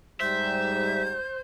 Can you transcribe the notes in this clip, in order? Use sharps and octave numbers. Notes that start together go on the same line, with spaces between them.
G#2 G3 C5 E5 G6